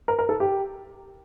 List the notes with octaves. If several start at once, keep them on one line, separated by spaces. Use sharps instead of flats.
A#4
A#4
A4
G4